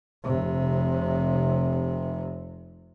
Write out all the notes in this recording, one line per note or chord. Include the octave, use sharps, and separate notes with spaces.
F1 C3